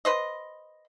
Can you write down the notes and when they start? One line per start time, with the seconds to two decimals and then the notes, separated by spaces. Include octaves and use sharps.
0.05 B4 C5 D#5